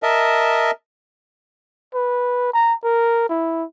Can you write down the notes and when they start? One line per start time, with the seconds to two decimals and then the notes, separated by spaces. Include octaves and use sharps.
0.03 A#4 D#5 E5 A5
1.94 B4
2.53 A#5
2.83 A#4
3.29 E4